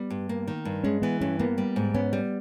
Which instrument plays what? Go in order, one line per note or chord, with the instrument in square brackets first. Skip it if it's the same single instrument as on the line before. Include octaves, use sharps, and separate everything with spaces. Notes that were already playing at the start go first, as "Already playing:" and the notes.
Already playing: [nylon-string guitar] G3 [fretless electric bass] B3
[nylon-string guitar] G2
A#3
D#3
G2
[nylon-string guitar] G#3 [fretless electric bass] C#4
[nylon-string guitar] E3 [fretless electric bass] B3
[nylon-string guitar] G2 [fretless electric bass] C#4
[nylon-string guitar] A#3 [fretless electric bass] B3
[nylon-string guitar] G3
G#2
[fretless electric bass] B3 [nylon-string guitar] C#4
[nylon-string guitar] G3